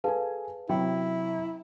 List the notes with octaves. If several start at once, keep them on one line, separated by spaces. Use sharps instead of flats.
G#4 A4 B4 F5 G#5 A5
C3 F#3 C#4 E4 G5 B5